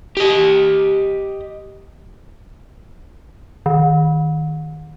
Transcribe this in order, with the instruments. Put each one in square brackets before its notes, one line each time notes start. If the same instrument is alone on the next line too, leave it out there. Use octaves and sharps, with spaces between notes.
[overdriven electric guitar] G4 D#5
[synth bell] D#3